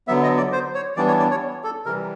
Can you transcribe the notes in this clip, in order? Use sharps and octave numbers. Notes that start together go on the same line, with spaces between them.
D3 F#3 B3 E5
D#5
D5
C5
C#5
E3 G3 B3 D4 D5
C#5
D5
C#5
A4
C3 E3 G3 A#4